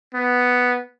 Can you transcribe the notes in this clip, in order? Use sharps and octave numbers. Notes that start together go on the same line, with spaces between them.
B3